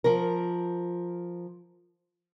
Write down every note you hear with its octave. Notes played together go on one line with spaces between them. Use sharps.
F3 A#4